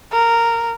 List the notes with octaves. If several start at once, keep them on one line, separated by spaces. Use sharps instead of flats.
A#4